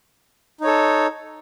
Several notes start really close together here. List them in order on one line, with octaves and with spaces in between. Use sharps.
D#4 C#5 A4